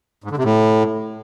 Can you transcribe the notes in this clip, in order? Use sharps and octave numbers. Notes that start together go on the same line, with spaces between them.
G#2
D3
C3
A2